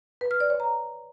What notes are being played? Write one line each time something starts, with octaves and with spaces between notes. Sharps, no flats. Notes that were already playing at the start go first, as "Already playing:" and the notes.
B4
F6
D5
C#5
A#5